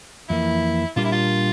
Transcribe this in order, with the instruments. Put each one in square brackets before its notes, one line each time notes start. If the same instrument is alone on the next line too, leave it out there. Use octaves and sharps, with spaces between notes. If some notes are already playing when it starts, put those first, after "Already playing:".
[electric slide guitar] F2 E3 A#3 [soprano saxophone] E4
[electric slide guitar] A#2 G3 D4 G4 A#4 [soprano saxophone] F4
[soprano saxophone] E4
F4